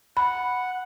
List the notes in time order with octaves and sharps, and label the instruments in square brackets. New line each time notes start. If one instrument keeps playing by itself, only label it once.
[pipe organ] F#5 [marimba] B5